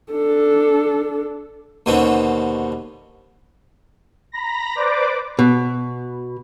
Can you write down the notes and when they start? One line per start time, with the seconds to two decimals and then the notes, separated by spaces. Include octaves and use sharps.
0.12 D4 A4
1.86 D#2 B2 D3 C4 C#4
4.32 A#5 B5 A#6
4.75 B4 C5 D5 D6
5.39 B2